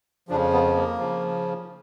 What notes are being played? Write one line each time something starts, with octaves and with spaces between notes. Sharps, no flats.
F2 C#3 F3 D4
B3
A#3
C#3 F3